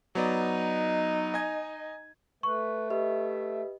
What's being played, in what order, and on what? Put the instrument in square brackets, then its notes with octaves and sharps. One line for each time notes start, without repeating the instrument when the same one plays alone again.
[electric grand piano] F#3 B3 D5 [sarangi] D#4
[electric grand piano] D#5 G#5 G#6
[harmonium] A3 [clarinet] B4 [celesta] C#6
[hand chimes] G4 B4 D#5 [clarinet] E5